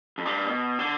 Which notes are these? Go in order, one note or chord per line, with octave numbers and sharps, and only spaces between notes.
F2
G2
B2
D3